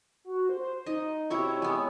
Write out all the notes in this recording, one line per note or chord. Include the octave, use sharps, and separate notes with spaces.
F#4
C5
D#4 D#5
C3 E4 F#4 C#5
G#3 B3